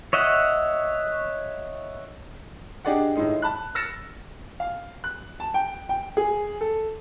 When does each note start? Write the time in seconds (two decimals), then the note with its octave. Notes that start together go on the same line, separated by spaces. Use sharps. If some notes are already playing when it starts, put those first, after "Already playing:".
0.13 C#5 D#5 E5 F#5
2.85 D4 G4 G#4 D5 D#5 F#5
3.16 A2 D#3 G#3 D#4
3.42 A5 B5 F#6
3.75 E6 F6 A6 A#6 C#7 E7
4.60 F5
5.04 F#6
5.40 A5
5.54 G5
5.89 G5
6.17 G#4
6.61 A4